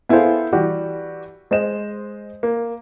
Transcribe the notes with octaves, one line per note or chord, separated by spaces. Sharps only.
B3 E4 G#4 A4 C5 F5
E3 G3 F#4 G4
G#3 C5 D#5 E7
A#3